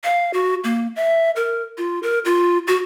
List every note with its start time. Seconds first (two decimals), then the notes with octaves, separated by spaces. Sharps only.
0.04 F5
0.34 F#4
0.64 A#3
0.96 E5
1.36 A#4
1.78 F4
2.03 A#4
2.25 F4
2.68 F#4